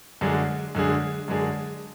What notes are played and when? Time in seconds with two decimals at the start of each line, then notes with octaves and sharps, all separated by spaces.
0.21 F#2 D3 G#3 D4 G#4
0.75 F#2 D3 G#3 D4 G#4
1.28 F#2 D3 G#3 D4 G#4